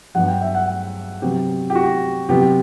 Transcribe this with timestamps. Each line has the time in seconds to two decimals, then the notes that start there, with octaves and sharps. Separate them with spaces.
0.15 G2 F#3 B3 F#5
0.28 G5
0.42 E5
0.55 F#5
1.22 C3 F#3 B3 G4
1.70 G4
1.75 F#4
2.29 C3 F#3 B3 G4